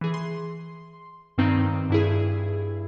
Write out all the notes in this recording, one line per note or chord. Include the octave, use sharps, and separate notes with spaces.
E3 G#4
C6
G2 D#3 C4 D#4
G2 E4 G#4